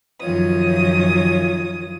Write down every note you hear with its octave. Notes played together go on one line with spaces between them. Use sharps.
F#2 D#3 F3 F4 C#5 D#6